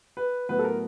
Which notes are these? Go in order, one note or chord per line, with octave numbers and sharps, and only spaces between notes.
B4
A2 F#3 B3 B4
A4
A#4